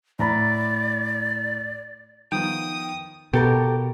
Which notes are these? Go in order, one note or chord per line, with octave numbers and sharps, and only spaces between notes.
A2 D5 A#5 B5
D#3 F3 B3 G5 D#6
B2 G4 A4 A#4